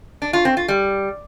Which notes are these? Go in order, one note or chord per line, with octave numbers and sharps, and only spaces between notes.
D4
F4
C4
F4
G3